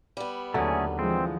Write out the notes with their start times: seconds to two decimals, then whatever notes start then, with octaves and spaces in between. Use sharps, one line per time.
0.17 G3 B3
0.54 D#2 D3 F#3 A3 C#4 G#4
0.99 E3 F3 G#3 C4